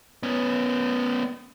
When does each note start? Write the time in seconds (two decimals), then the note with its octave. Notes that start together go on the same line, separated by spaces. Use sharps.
0.23 B3 C#4